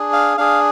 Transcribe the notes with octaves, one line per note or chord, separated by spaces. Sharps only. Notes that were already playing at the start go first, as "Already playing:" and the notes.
Already playing: D4 G#4
F5
D4 G#4 F5